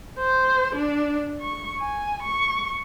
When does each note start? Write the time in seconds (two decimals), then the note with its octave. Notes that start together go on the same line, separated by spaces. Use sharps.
0.19 C5
0.75 D4
1.41 C#6
1.80 G#5
2.23 C#6